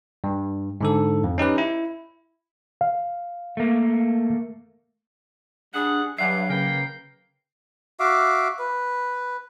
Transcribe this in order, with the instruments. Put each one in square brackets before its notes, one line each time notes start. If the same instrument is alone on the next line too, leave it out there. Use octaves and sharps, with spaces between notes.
[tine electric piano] G2
G#2 D3 A4
F2
C#4 D#4 G4 B4
E4
[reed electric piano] F5
[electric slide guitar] A3 A#3
[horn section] G3 G#4 F#5 [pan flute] D4
[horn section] G2 [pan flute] F#3 [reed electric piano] E5 F#5 G#5 [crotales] C7
[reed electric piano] C#3 B4 [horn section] A#3 A#4 G5
[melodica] F#4 E5 F5 D6
B4